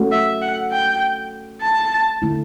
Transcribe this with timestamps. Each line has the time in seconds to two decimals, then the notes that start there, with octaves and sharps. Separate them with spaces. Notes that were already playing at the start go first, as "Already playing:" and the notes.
Already playing: A3 C#4 F#4
0.12 E5
0.42 F#5
0.72 G5
1.62 A5
2.22 D3 A3 E4